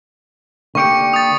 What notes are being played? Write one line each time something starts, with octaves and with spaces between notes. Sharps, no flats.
D3 A#3 G4 C#6 C#7 D7
D#6 A6